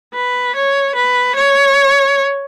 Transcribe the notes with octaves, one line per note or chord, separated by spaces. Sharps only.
B4
C#5
B4
C#5